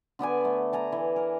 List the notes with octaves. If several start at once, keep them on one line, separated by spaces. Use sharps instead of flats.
D3 B3 D5 G#5
A3
D5 G#5 A#5
E3
A#4